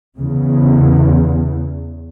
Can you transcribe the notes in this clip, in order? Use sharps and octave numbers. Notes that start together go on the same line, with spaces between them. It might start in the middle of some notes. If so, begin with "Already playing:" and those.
E2 C#3